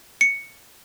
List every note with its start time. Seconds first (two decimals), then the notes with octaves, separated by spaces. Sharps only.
0.21 C#7